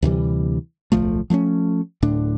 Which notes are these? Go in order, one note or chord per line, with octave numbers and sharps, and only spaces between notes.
D2 C3 E3 G3
D1 B1 F3 A3
F3 A3 C4 C#4
D1 A2 D3 D4